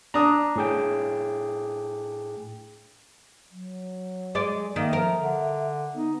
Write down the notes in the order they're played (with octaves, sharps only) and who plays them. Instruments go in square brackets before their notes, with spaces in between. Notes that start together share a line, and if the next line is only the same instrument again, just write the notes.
[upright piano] D4 D#6 [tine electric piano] A#5
[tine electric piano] A2 G#4 G5
[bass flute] F#3
[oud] G#3 D5
[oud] D#3 [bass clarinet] A#3 [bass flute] E5
[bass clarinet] F3 [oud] A#4
[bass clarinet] D3
[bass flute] B3 [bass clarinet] D#4